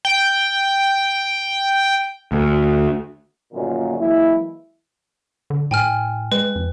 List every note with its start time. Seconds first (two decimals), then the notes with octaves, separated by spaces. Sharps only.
0.05 G5
2.32 D2
3.53 G1 F#2 A#2 D#3
4.00 E3 F#3 G#3 A#3 E4
5.50 D3
5.71 A2 G5 G#5 F6
6.32 G#3 B4
6.56 F2